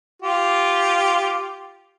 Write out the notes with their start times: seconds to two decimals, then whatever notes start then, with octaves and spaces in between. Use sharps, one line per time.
0.22 F4 G4